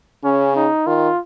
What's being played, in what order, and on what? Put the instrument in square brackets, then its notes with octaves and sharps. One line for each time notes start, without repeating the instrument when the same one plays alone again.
[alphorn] C#3 [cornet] C#4
[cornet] D#4
[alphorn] D#3 [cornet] F4